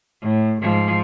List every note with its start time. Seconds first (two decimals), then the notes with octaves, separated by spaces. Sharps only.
0.22 A2
0.61 G#2 F3